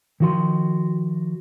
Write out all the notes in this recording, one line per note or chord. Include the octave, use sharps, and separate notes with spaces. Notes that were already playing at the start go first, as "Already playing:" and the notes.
D#3 F3 F#4 D5 C6